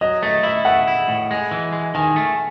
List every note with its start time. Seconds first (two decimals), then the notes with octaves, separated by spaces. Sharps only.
0.01 F#3 D#5
0.23 A3 D#5
0.43 E4 E5
0.65 A3 F#5
0.87 E4
1.08 A2
1.31 G#3
1.51 E3
1.73 G#3
1.95 D#3 G#5
2.16 A3